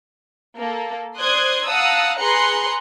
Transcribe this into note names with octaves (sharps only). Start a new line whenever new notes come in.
A#3 A4
C5 D5 C6 D#6 F#6 G#6
F5 F#5 A5 A#5 D#6 E6
G#4 B4 A#5 C6 F#6 C#7